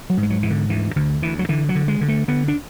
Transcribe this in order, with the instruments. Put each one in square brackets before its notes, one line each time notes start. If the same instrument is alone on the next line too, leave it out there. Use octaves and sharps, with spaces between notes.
[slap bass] F#3
G#2
G#3
F#3
G#2 E3
D3
D2 E3
D2 D3
D2 E3
F#3
D3 E3
F#3
D3
G#3
D3
A3
D3 B3
D4